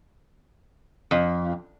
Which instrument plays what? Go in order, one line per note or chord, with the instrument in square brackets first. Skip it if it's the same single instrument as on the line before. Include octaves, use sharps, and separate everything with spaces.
[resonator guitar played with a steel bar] F2